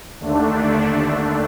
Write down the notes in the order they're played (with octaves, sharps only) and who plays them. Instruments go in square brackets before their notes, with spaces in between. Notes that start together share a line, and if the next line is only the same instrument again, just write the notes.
[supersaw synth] D#2 D3 A3 D4